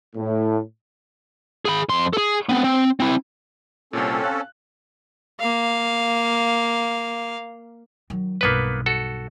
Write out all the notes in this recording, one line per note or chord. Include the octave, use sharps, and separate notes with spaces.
A2
G#4 B5
F2 C6
G#4 A4
B3 C4
C4
C4 E4
C2 A#2 C4 C#4 A4
F5 F#6
A#3 F5
D#3 F#3
B1 G2 A#3 B3 B4
F#4 A4